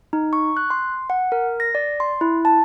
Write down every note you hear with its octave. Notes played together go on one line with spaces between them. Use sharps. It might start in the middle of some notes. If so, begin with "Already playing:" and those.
D#4
C#6
F#6
C6
F#5
A#4
A#6
D5
C6
E4
A5